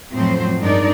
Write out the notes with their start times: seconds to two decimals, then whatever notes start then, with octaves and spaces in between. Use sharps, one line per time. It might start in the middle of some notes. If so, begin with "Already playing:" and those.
0.13 F2 A2 F3 F#3 C4 C5
0.59 G2 G#3 D4 D#4 A#4 D5